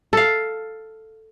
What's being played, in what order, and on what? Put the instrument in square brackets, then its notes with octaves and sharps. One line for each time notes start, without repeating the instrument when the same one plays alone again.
[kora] A4 F5